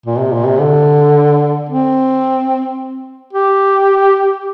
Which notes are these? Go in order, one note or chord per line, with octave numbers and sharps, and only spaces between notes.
A#2
C3
A#2
C3
D3
C4
G4